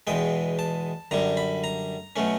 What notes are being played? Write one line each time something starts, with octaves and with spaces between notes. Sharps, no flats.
E2 B2 G#3 G5
A5
F#2 D3 G3 A#5
B5
A#5
B2 F#3 A3 C#4